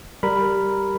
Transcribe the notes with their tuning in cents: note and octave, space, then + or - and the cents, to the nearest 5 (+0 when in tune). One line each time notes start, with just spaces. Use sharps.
G3 +0 A#4 -5 B5 +0